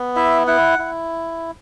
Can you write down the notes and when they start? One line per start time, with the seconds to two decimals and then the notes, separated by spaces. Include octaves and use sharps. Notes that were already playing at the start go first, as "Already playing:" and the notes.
Already playing: B3
0.16 E4 E5
0.47 E4 F#5
0.79 E4